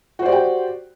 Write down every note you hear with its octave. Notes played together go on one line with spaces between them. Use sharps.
F#4 G4 C5 D5 G5